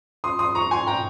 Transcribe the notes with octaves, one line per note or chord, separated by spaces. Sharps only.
C6 D#6
C6 D#6
A#5 C#6
G#5 C6
G5 A#5